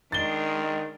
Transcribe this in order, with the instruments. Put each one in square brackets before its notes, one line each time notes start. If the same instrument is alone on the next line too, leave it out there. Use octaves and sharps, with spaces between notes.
[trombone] D#3 [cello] G#3 D4 [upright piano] A6 G7